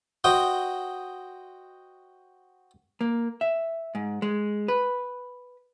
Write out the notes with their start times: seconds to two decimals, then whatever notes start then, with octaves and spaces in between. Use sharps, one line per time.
0.24 F#4 C5 D#5 G5
3.01 A#3
3.41 E5
3.95 G#2
4.22 G#3
4.68 B4